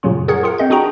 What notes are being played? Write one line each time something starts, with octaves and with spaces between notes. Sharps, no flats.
F#2 A#2 C#3 F#3 C#4 F4
G#4 A#4 C#5 F#5
F4 G#4 A#4 F#5
C4 D#5 G6
D4 F#4 G#4 G5 A#5